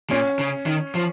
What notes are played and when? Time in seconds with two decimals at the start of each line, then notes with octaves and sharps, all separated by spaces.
0.10 A#2 C#4
0.39 C#3
0.66 D#3
0.95 F3